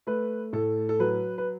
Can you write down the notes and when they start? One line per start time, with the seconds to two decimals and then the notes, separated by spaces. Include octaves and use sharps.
0.07 A3 B4
0.53 A2 A4
0.89 A4
0.99 F#3 B4
1.38 B4